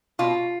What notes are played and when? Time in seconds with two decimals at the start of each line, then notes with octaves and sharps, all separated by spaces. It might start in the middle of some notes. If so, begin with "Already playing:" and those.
0.19 B2 F4